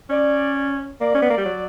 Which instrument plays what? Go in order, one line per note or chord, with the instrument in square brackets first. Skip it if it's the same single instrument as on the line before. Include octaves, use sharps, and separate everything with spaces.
[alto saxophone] C#4 [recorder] D5
[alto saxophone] A#3 [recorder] D5
[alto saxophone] C#4
B3
A#3
G3
F#3